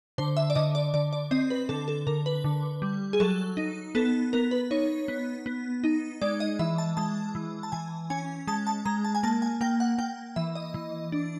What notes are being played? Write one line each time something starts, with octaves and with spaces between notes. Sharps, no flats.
D3 C5
E5
D5
D3 D#5
D5
D3 D5
D5
C4 D#5
B4
D3 A4
A4
D3 A#4
B4
D3
G3
G#4
F#3 A4
D#4
B3 A4
B3 A#4
B4
D#4 C#5
B3
B3
D#4
G#3 D5
D#5
E3 E5
A5
G#3 A5
E3
A5
E3 G#5
C#4 G#5
G#3 A5
A5
G#3 A#5
A5
G#5
A#3 A5
G#5
A#3 G5
F#5
A#3 G5
E3 E5
D#5
E3
D4